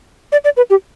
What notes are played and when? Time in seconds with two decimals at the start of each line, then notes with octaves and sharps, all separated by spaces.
0.32 D5
0.44 D5
0.57 B4
0.70 G4